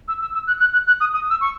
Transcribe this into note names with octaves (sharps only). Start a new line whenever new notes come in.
E6
E6
E6
F#6
F#6
F#6
F#6
D#6
D#6
E6
C#6